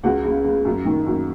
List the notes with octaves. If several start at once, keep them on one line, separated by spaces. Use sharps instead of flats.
C#2 F#4 F#5
C#3
C#3
F#2
D#3
F#2